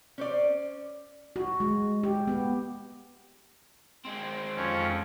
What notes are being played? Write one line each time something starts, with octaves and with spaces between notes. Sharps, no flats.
C#4 C5 D5
F#4
G#3
G4
B3
G#3 C4
F2 C#4